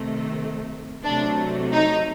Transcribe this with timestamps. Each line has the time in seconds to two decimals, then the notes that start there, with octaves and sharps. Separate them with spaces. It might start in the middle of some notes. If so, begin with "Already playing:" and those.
Already playing: C3 D#3 A3
1.03 C3 F#3 A3 D4
1.72 D#4